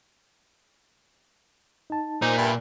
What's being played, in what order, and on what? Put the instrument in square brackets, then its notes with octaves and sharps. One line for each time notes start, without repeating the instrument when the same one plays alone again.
[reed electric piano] D#4 A5
[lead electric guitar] A#2 [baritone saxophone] D#4 [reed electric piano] C5
[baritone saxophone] G2 [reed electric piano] E5 B5